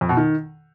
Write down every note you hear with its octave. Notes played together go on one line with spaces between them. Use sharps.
F2
B2
D#3